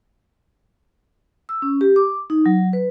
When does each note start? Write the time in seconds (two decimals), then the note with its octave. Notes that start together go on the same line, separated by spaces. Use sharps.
1.49 E6
1.62 C#4
1.81 G4
1.96 D6
2.30 D#4
2.46 F#3
2.73 B4